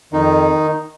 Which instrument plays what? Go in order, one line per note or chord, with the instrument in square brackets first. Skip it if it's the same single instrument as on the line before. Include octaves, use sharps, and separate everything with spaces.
[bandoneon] F2 D#3 D#4